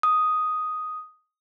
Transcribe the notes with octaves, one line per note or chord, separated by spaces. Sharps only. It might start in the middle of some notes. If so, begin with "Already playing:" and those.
D#6